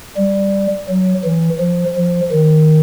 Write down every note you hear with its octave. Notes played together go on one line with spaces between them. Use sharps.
G3
F#3
E3
F3
F3
D#3